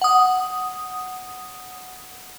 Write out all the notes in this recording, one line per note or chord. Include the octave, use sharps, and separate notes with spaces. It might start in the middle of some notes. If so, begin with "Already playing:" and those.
F#5 D#6